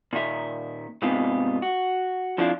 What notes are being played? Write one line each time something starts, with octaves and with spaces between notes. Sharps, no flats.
A#2 D#3 E5
G#2 C3 B3 D#4 F4
F#4
F2 F3 D4 E4 F4